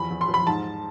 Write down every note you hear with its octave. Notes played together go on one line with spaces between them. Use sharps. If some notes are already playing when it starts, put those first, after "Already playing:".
Already playing: E2 F3 B5
E2
C6
F3
B5
G#2 A5